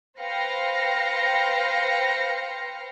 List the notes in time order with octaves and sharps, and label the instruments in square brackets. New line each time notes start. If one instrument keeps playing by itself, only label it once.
[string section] B4 C5 F5 G5 A#6 C#7